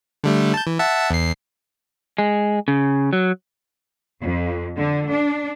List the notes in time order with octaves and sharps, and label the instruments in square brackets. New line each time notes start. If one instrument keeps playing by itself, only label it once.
[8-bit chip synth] D3 G3 A3
A5 G6
E3
E5 F#5 A5
E2 C7
[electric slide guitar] G#3
C#3
F#3
[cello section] F2
D3
D4